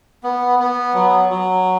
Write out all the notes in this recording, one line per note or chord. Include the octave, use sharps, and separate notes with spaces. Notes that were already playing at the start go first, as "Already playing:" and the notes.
B3
B3
F#3
F#3